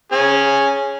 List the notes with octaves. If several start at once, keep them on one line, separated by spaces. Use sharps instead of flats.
C#4 G#4